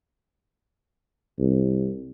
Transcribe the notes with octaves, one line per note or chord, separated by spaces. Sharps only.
C2